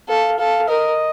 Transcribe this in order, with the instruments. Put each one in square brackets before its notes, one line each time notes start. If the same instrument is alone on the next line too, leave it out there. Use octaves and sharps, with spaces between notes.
[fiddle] A4 [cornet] F5
[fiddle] A4 [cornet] F5
[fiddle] A#4 [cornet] D#5